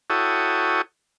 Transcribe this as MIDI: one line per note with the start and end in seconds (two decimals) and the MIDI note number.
0.10 0.82 64
0.10 0.82 66
0.10 0.82 69
0.10 0.82 73
0.10 0.82 79
0.10 0.82 87